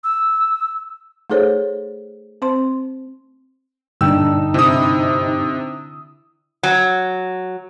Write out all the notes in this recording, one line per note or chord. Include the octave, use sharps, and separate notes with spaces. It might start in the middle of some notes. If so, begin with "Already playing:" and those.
E6
A3 D#4 G#4 A4 C5 C#5
C4 C5 C6
G2 A#2 D3 D4 D#4 G5 E6
C3 E4 D#6
F#3